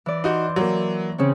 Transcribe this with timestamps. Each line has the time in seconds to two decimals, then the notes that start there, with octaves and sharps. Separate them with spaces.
0.06 E3 D5
0.24 D#4 F#4 C6 G6
0.56 F#3 A#3
1.18 C#3 C4 C#4